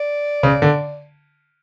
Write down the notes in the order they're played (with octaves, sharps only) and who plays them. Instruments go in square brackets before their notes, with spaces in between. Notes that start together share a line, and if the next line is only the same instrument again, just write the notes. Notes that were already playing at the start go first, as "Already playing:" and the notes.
Already playing: [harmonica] D5
[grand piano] C#3
D3